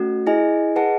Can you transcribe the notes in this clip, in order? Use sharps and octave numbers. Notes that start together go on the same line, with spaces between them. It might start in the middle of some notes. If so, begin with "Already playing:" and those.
Already playing: A3 C#4 F#4
E4 G#4 D#5 G#5
G#4 B4 D#5 F#5 A5